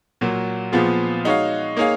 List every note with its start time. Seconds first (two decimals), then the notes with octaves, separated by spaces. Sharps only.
0.21 A#2 F#3 A#3
0.72 A#2 F3 B3 F4 G#4
1.25 G#3 D#4 F#4 C#5 F5
1.76 A#3 D#4 G#4 C#5 F5